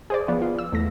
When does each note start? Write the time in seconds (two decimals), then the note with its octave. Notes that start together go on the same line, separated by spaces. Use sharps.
0.10 G#4 C5 D5
0.28 F3 B3 D5
0.42 F4
0.59 E6
0.72 E2 A3 A#6